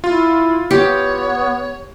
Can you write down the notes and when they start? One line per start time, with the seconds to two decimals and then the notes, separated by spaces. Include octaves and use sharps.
0.04 E4 F4
0.71 B3 G4 C#5